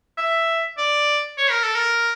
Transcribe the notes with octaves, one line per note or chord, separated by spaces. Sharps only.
E5
D5
C#5
A#4
A4
A#4